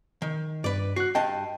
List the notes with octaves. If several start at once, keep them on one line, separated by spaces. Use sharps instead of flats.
D#3
G2 B4 D5
F#4 F#6 C7
G2 D#5 G5 A5